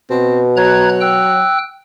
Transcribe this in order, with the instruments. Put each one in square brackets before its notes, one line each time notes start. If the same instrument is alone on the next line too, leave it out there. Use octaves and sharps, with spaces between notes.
[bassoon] B2 [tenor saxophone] C4
[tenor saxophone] F#3 [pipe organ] A#5 F#6 G#6
[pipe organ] G5 E6 F#6